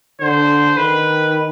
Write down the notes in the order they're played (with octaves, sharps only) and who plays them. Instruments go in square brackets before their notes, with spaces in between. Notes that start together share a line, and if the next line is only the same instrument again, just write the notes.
[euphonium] D3 [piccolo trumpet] C5
[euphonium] D#3 [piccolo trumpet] B4